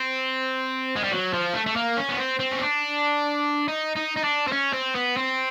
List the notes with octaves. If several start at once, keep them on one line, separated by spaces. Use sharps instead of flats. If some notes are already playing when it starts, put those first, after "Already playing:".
Already playing: C4
G#3
G3
F#3
F3
A3
A3
A#3
C#4
B3
C4
C4
C#4
D4
D#4
D#4
D#4
D4
C4
C#4
C4
B3
C4